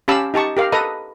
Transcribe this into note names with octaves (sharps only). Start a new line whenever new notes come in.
C#4 G4 F5 A5 B5 E6
D#4 G4 A5 C#6
G4 A#4 F5
A4 B4 D#5 A#5 D#6